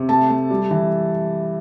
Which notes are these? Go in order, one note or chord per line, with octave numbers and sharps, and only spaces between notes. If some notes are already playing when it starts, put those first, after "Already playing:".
Already playing: C3
A3 A5
A3
G3
E3